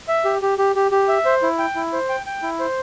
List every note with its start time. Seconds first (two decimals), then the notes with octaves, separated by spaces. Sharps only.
0.08 E5
0.25 G4
0.42 G4
0.58 G4
0.76 G4
0.91 G4
1.08 E5
1.25 C5
1.43 E4
1.58 G5
1.75 E4
1.93 C5
2.09 G5
2.26 G5
2.43 E4
2.59 C5